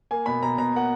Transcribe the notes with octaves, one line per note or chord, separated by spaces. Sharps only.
A#3 G#5
B2 B5
B2 A#5
B2 A#5
A#3 F#5